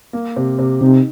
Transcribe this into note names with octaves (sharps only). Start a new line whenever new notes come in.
A#3
C3
C3
C3 D#4